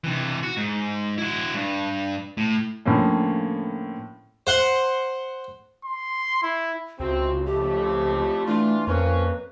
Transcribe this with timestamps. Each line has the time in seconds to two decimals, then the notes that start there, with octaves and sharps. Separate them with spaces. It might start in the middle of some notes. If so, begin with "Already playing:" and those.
0.04 C3 E3
0.43 F#4
0.57 G#2
1.18 E4 F#4
1.54 G2
2.37 A2
2.85 A2 D3 F3 A#3 C#4
4.47 C5 F#5 C6
5.84 C6
6.43 E4
7.00 C#2 C3 C4 F#4
7.46 F2 A2 A3 G4
8.46 E3 A3 D4 F4
8.87 F2 A#3 C4 C#4 B4